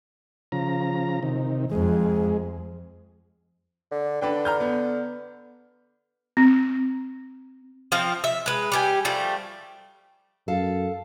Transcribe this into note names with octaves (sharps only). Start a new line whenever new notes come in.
C#3 F3 A#5
C3 D#3
F2 G#3
D3
D3 D4 B4 G5
A#5 F6 G6
B3
C4
F3 C4 F5
E5
G#3 B4
G3 G4 G#5
F3 G3 A3
F#2 A4 F5